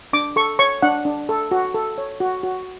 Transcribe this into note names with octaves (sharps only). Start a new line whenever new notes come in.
D4 D6
A4 C#6
C#5 C#6
D4 F#5
D4
A4
F#4
A4
C#5
F#4
F#4